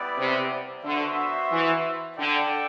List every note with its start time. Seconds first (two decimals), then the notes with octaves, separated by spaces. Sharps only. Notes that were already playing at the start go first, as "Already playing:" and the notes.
Already playing: G3 B3 E4 B4 D5
0.18 C3
0.84 D3 B3 F#4 C5 E5
1.51 E3
2.17 D3 D4 A4 D5 G5